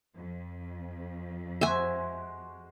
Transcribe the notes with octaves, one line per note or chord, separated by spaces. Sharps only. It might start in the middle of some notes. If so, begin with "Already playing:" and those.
F2
G#3 F#4 C5 E5 G#5